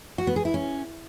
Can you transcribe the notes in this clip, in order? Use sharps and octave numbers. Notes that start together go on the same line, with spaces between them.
F#4
B3
G#4
E4
C#4